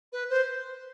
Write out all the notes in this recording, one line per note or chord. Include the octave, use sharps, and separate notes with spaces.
B4
C5